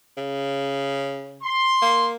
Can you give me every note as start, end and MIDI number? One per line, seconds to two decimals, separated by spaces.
0.17 1.46 49
1.43 2.09 84
1.82 2.16 58